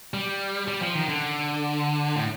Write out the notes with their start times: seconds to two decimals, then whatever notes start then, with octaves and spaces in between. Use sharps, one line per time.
0.14 G3
0.68 G3
0.82 F3
0.95 D#3
1.09 D3
2.16 A2